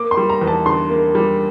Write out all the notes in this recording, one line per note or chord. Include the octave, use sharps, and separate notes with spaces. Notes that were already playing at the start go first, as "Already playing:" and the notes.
Already playing: A#3 D6
C6
G3
A#5
E2
A5
D3 C6
A#3
G3